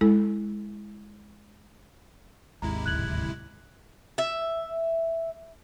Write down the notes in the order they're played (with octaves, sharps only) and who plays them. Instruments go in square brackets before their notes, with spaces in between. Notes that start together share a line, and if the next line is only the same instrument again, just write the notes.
[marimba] G#3 E4 A4
[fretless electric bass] G#1 D#2 [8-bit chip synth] C3 G#3 E4 [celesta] A#5
[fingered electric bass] D1 [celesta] F#6 G#6 F#7
[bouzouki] E5